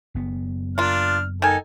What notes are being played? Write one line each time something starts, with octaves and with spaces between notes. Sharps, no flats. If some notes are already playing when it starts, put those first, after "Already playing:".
F#1 B3
A#3 D4 F4 F6
D#3 D#4 A4 G#5